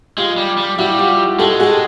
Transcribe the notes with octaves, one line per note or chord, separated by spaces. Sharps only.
G#3 F4 G4
G3
G3
G4
G3 E4 F#4
F4 G4
G#3 G4 A4
F#4 G#4